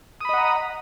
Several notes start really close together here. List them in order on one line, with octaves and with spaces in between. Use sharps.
D#6 B5 D#5 F#5 A#5